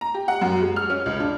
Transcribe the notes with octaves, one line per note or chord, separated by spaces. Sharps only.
A#5
G4
F#5
F#2
G#3
F6
C#4
C#2
D4